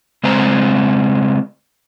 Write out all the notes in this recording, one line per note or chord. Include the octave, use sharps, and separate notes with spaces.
C#3 G#3 C4 C5 A#5